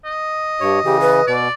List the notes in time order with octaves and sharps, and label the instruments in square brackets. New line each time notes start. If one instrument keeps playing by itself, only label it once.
[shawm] D#5
[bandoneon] G2 C#5 [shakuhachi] G4
[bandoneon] C#3 E3 [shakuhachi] G4
[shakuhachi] B4
[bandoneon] B2 [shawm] D5